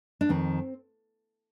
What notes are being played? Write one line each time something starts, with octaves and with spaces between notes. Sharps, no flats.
D4
F2 D#3 C4